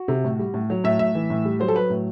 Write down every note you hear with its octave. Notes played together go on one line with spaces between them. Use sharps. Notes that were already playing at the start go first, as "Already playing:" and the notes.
Already playing: F#4
C3
A2
G3
A2
F#3
A2 E5
A2 E5
E3
A2
G3
F#3 C5
A4
F#3 B4
A2